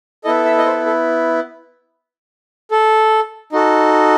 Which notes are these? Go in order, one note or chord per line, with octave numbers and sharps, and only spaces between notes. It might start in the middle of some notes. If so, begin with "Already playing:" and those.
B3 E4 A4 D#5
E5
D#5
C5
A4
A4
D#4 F#4 A4